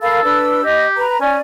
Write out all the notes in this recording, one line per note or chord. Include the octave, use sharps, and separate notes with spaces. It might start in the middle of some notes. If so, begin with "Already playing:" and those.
A4 A#4 F5 B5
D4 B4 E6
G4 D#5
B4 A#5
C#4 D5 G#5